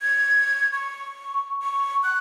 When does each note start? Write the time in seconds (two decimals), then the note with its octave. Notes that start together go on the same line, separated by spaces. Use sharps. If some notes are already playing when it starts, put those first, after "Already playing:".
0.02 G#6
0.72 C#6
1.62 C#6
2.04 F#6